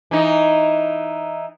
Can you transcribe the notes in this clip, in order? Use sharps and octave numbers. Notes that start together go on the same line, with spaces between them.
E3 D#4